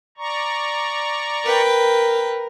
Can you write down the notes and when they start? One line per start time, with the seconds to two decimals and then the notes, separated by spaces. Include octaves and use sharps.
0.18 D5 A#5 C#6
1.45 A#4 B4 G5